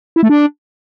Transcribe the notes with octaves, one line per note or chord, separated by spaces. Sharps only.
E4
A3
D4